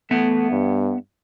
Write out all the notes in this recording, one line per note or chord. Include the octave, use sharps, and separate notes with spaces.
A3 B3 E5 F#5
G2